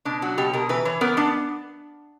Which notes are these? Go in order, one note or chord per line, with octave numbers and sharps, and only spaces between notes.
B2 D4
F#3 F#4
B2 G4
B2 A#4
E3 B4
E3 C#5
B3 A#4
B3 D4